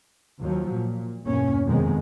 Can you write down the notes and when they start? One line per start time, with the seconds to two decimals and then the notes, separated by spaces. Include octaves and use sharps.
0.41 D#2 F3 F#3
0.71 A#2
1.23 E2 G2 B2 A#3 C#4
1.66 F2 C3 D#3 G#3 B3